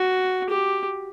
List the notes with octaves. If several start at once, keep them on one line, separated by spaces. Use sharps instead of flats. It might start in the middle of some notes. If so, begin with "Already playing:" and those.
Already playing: F#4
G4